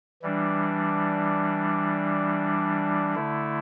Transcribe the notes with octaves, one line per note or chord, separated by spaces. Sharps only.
E3 G3 D4
D3 A3 E4